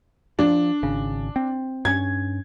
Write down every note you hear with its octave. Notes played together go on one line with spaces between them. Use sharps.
F3 D4
G#1 C#3
C4
G2 C#4 G#6